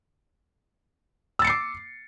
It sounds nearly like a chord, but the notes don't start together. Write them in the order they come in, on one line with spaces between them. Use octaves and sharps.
E6 A6 C#7 C7 D6